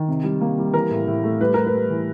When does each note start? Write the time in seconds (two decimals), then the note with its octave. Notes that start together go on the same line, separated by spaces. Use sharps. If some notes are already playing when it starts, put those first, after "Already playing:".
Already playing: D#3
0.08 C3
0.24 G3
0.41 A#3
0.58 G3
0.74 E3 A#4
0.91 A2
1.07 A2
1.23 A3
1.41 G3 B4
1.54 G3 A#4
1.67 B4
1.73 G3
1.90 E3